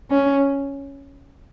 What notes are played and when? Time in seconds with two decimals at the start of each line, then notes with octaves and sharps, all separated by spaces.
0.10 C#4